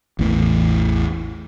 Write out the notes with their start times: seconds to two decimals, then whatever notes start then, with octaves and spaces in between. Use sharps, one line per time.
0.19 A1 E2 A2 E3